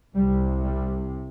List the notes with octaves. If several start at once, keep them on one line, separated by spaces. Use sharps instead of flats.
C2 C3 G3
G3